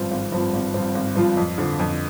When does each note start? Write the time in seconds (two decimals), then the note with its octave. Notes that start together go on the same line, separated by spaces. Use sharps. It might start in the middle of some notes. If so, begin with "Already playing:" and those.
Already playing: G#1 G2 F3 C4 F4
0.11 G#1
0.32 G2 F3 C4 F4
0.53 G#1
0.74 G2 F3 C4 F4
0.95 G#1
1.15 G2 F3 C4 F4
1.37 F2
1.58 D3 F3
1.79 F2